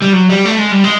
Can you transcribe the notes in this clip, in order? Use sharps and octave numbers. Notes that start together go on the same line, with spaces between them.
G3
F#3
G3
A3
G#3
G3
G#3